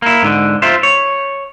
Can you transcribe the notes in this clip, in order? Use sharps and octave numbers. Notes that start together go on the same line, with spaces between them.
A#3 E4
G#2 D3
F4 C5 E5
C#5